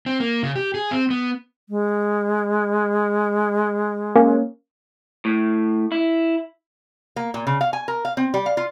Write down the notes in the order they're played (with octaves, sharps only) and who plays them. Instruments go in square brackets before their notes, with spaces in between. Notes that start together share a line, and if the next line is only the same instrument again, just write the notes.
[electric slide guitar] C4
A#3
C#3
G4
G#4
C4
B3
[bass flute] G#3
[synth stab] A#3 C#4
[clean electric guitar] A2
E4
[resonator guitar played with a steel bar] A#3
A#2
C#3
F5
G#5
A#4
F5
C4
G3
F5
F4